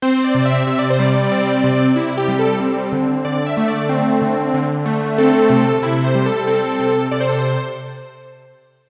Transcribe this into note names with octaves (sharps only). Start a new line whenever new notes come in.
C4 C5
D5
C3
E5
C3 E5
D5
C5
G3 D5
C4
C3
C3 E4
G4
G3
A4
C4
D3
D3 D5
E5
A3 E5
D5
C4
D3
D3
A3
C4 A4
C3
C3 E4
C5
G3
A4
C4
C3
C3 D5
C5
A4
C5